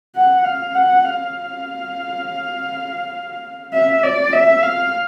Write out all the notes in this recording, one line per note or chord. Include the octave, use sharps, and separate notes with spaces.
F#5
F5
F#5
F5
E5
D5
E5
F5